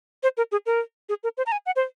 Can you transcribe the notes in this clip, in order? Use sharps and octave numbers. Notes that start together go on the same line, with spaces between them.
C5
A#4
G#4
A#4
G#4
A#4
C5
A#5
G#5
F#5
C5